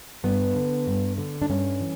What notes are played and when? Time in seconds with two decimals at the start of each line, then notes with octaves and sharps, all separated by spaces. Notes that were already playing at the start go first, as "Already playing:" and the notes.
0.23 G2 B3
0.55 D3
0.87 G2
1.18 D3
1.42 D4
1.50 G2 C#4
1.80 E3